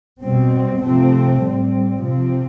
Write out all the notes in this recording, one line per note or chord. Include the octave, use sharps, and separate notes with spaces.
B2 G3 C4
C3 F3 A3 C4
A2 G3 C4
C3 F3 C4